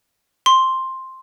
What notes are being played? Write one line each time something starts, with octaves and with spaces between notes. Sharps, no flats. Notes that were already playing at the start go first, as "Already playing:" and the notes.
C6